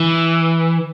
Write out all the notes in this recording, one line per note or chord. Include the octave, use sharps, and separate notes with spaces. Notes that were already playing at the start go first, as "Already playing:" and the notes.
Already playing: E3